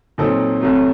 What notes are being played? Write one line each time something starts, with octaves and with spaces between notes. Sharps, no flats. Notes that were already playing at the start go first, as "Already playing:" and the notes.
A#2 F#3 C4 D#4 A4
C2 C3 F#3 A3